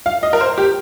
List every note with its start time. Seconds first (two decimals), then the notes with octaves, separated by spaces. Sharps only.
0.06 F5
0.23 D#5
0.33 A#4
0.41 C5
0.58 G4